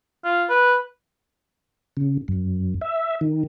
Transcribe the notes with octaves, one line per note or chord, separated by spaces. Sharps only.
F4
B4
C#3
F#2
E5
D#3